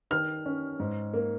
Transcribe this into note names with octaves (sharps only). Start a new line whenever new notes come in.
D#3 F6
C#4
G#2
A#3